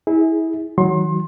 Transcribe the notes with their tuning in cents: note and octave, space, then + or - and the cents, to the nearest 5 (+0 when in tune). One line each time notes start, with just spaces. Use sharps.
E4 -25 G#4 +0
D#3 +40 F#3 +0 C6 +30